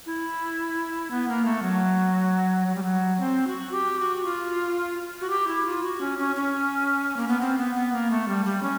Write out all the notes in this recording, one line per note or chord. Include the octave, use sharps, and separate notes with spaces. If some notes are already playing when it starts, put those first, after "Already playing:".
E4
B3
A#3
A3
F#3
F#3
G3
F#3
C4
F#4
G4
F#4
F4
F#4
G4
E4
F4
F#4
C#4
C#4
C#4
A#3
B3
C4
B3
B3
A#3
A3
G3
G3
C#4